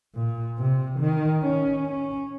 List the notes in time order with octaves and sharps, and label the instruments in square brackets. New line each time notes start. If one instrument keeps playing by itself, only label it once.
[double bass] A#2
C3
D#3
C#4
C#4